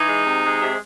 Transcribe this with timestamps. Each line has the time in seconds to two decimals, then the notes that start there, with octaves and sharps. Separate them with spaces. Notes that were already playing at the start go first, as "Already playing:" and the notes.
Already playing: E3 D#4
0.08 G#3
0.25 C3
0.44 G#3
0.62 C3